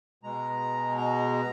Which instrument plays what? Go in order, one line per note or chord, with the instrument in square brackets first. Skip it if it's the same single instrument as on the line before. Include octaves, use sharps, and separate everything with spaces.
[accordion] B2 G#3 A#5
A#5